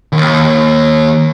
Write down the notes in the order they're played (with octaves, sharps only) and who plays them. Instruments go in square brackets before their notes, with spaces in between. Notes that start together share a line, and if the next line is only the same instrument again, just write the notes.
[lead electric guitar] D#2